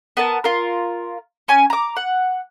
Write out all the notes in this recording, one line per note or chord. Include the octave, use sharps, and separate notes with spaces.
B3 A#4 A5
F4 A#4
C#4 G#5
A#5 D6
F#5